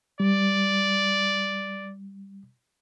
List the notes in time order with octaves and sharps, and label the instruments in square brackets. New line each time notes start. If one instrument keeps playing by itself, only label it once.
[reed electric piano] G3 [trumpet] D5